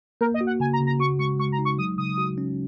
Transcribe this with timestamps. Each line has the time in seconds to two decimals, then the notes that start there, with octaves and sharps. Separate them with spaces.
0.21 A#3 A#4
0.34 D#5
0.41 F#4
0.47 F#5
0.60 C#3 G#5
0.73 A#5
0.80 C#3
0.87 A#5
1.00 F#4 C#6
1.19 G#3 C#6
1.39 G#3 C#6
1.52 A#5
1.59 D#4
1.65 C#6
1.78 F#3 D#6
1.98 C#3 D#6
2.18 F#4
2.38 C#4